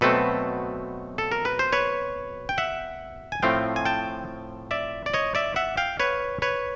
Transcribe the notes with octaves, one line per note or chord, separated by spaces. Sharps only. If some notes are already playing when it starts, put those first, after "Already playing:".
B2 F#3 A3 C4 A4 B4
A4
A#4
B4
C5
B4 C#5
G5
E5 F#5
G#5
A2 F3 A3 C4 F5 G5
G#5
G5 A5
D5 E5
D5
C#5 D#5
D5 E5
E5 F#5
F5 G5
B4 C#5
B4 C#5